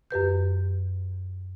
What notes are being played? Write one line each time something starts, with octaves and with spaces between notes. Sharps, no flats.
F#2 G4 B4 G6